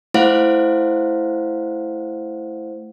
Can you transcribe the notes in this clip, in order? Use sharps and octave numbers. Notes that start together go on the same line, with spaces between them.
A3 E4 C5 F5 F#5